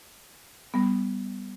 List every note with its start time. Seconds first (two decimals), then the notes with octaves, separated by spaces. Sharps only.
0.74 G3 B3